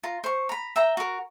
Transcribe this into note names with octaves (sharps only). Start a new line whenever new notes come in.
F4 A#5
C5 C#6
A#5 B5
E5 G5 A#5
F#4 A#4